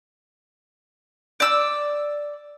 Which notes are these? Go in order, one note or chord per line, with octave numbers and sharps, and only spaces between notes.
D5 E6